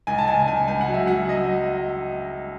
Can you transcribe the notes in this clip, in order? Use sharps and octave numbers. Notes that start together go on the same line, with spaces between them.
C#2 G#5
A5
C#2 G#5
C#2 G#5
C#2 G#5
F#5
F#3
E5
F#3 F#5
F#3 D#5